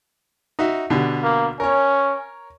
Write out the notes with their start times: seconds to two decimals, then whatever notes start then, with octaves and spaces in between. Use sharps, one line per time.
0.59 D#4 F#4 E5
0.90 B2 D3 G4
1.23 A#3
1.60 C#4 A#4 C#5